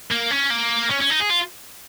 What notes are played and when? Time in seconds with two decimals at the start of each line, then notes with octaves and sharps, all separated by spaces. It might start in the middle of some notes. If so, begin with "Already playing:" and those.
0.11 A#3
0.31 C#4
0.50 A#3
0.91 C#4
1.02 C#4
1.11 D#4
1.21 G#4
1.31 F4